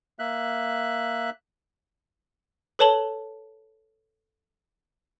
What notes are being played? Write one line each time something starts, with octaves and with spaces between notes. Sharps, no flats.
A#3 E5 F#6
A4 B4 C#5 A5 F#7 G7